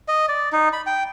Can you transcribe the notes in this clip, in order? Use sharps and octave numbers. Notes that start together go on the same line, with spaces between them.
D#5
D5
D#4
B5
G5